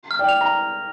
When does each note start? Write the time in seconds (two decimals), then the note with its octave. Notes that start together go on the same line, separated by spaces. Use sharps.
0.11 F6
0.19 D5 G5
0.29 F7
0.41 A#5